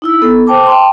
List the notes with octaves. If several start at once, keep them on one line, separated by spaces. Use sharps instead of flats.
D#4 E4 E6
B3 A4
C5 G5 A5 D6
G5 A5 C6